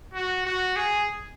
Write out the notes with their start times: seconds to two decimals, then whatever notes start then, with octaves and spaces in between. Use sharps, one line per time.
0.13 F#4
0.45 F#4
0.76 G#4